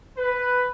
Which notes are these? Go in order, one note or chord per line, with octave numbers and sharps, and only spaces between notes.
B4